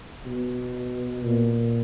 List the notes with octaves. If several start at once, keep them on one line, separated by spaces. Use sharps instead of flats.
B2
A#2